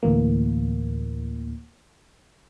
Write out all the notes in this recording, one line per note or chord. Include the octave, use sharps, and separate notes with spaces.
D2 A2 E3 A#3